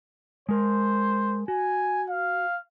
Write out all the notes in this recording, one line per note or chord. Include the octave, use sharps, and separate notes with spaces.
G#3 A#4 C5
F#4 G#5
F5